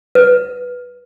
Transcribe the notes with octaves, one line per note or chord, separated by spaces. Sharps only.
B4